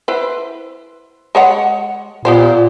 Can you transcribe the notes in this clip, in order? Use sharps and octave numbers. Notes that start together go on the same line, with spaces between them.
E4 B4 C5
G#3 C#5 F#5
A#2 B3 G4 C5